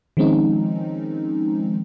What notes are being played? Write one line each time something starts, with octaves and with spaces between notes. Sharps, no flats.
D#3 F3 G#3 C4 C#4 D#4